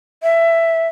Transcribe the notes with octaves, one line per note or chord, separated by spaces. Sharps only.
E5